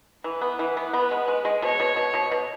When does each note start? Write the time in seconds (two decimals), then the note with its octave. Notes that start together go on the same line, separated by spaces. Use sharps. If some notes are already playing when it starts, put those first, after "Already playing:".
0.24 E3 B4
0.41 B3
0.59 E3
0.77 B3
0.93 B3 B4
1.11 G#3
1.28 G#3
1.45 G#3
1.62 B2 C#5
1.80 B2
1.96 B2
2.14 B2
2.31 B2